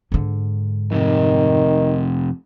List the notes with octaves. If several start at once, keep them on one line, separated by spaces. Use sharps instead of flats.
G#2 D3
F2 C3 D#3